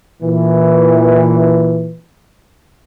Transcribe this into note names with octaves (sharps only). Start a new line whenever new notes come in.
A#2 E3